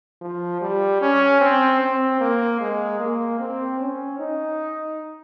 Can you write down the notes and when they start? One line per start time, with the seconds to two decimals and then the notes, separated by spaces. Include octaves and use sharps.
0.22 F3
0.61 G3
1.01 C#4
1.41 C4
1.81 C4
2.20 A#3
2.60 G#3
3.00 A#3
3.40 C4
3.80 C#4
4.19 D#4